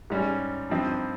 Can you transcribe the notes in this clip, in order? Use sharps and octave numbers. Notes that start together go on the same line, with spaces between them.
G#2 G3 C#4
G2 F3 C4 D#4